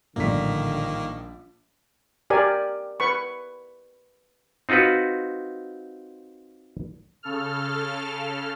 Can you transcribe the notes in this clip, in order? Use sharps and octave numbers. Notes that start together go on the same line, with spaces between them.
A#1 A2 D3 D#3 G3 A#3 D4 B6
G4 A#4 D5 G#5
B4 B5 C#6
C4 D#4 F4 F#4 B4
C#3 A4 F6